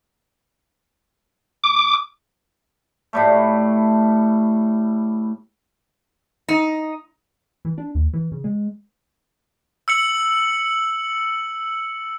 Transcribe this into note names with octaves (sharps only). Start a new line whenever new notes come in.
D6
A2 G3 A3
D#4
E3
D4
D#2
E3
C#3
G#3
E6 C#7 F#7